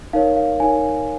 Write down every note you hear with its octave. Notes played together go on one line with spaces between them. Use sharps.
D#4 A#4 C#5 F5
F5
D#4 A#4 C#5 G#5